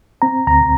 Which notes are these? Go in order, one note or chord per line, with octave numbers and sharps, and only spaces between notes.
C4 A#5
D2 A#5